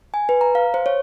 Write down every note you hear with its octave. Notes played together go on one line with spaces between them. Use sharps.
G#5
B4
A#5
F5
C5
C#5